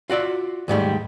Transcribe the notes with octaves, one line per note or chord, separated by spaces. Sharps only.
F4 F#4 D5 E5
D#2 G#2 G3 A3